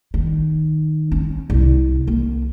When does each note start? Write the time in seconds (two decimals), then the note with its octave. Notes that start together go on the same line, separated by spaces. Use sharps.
0.14 D#3
1.12 C#4
1.50 C2
2.07 A#3